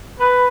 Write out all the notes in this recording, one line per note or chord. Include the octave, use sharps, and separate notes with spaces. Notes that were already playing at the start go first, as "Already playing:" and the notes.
B4